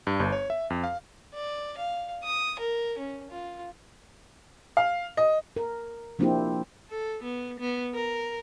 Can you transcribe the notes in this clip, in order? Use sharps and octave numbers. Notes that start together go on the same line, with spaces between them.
G2
G1
C#5
E5
F2
F5
D5
F5
D#6
A#4
C#4
F4
F5
D#5
A#4
F3 A#3 C4 D4 E4 G4
A4
B3
B3
A#4